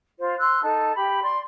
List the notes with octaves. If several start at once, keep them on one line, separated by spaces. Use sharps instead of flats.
F4 C5
C6 E6 F#6
D#4 A4 A5
G4 B5
D5 C6